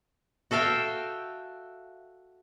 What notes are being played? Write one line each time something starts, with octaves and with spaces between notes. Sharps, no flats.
F#4 A4 E5 F5 G5